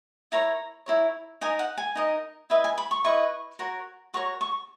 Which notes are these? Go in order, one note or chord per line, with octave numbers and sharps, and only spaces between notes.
E4 A#4 C#5 A#5
E4 A#4 C#5
D#4 A#4 D#5 G#5
F#5
G#5
D#4 A#4 D#5
E4 B4 D#5 E5
G#5
B5
C#6
E4 B4 D#5 C#6
F#4 A#4 C#5
F#4 A#4 C#5 C#6
C#6